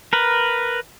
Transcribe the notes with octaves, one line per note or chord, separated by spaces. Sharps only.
A#4 B4